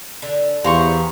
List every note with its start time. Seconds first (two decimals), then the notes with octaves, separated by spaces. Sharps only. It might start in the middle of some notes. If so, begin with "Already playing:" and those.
0.22 D3
0.64 E2 G4 C5 F5 A#5 C6 C#6